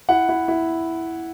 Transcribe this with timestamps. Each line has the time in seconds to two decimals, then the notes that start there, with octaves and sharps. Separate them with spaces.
0.09 E4 F#5
0.29 E4
0.48 E4